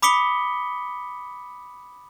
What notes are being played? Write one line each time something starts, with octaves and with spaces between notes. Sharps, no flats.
B5 D6 D#6 B6 C#7 G7